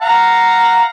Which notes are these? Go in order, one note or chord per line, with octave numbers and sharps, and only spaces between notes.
F5 F#5 A#5